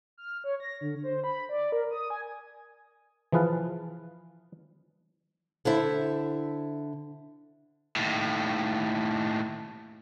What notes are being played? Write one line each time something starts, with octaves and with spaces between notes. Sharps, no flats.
F6
C#5
A#6
D3
C5
B5
D5
A#4
D#6
G#5
E3 F3 G#4 B4 F5 A5
D3 E4 C5 E5 A5
D#2 A2